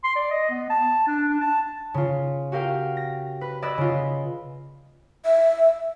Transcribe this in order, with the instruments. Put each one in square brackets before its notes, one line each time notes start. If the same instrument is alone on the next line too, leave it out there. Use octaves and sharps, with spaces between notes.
[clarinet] C6
D5
D#5
B3
A5
D4
D4
A5
[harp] C#3 F4
F#4 G4 A#4 F5 G5
A#6
B4
D5 D#5 B5 E6 F#6 G#6
C#3 F4
[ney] E5